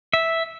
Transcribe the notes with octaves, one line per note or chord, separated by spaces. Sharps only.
E5